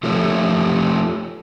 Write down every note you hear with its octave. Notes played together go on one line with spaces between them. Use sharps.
F3 A3 F4 G4 A4 C#5